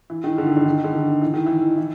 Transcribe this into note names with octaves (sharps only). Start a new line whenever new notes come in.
E3
D#3
D3
D#3
D3
D#3
D3
D#3
E3
D#3
E3
E3